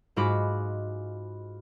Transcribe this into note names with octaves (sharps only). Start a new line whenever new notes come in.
G#2 G#3 F4 F#4 B5 D6